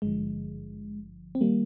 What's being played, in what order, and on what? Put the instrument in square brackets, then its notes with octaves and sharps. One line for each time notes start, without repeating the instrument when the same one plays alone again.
[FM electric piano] G#1 G2 D3 F3 G#3
C4
D#3 G3 A#3